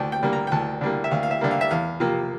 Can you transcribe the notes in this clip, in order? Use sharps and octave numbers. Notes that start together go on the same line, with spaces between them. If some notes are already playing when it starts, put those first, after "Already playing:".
Already playing: D2 D5 G5 A5
G5
D3 G3 A#3
A#5
G5
D2 A5
D3 G3 A#3
E5
D2 F5
F5
E5
D3 G3 A#3
F5
E5
E2 F5
C3 F3 A#3